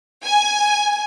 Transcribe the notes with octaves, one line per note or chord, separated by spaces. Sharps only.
G#5